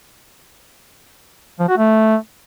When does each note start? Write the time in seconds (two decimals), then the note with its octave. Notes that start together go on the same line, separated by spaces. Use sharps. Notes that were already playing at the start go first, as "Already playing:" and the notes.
1.59 F3
1.69 F#4
1.78 A3